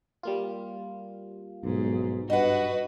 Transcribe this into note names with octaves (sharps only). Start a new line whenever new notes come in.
G3 A#3 F4
B1 G#2
G2 F#4 B4 D#5 F#5